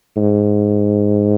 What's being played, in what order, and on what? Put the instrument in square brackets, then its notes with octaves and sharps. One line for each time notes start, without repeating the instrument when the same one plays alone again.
[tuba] G#2